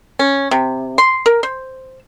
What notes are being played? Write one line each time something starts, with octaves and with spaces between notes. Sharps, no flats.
C#4
C3
C6
A#4
C5